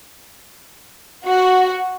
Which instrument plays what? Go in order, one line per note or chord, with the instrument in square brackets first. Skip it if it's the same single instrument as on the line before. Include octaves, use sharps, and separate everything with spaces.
[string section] F#4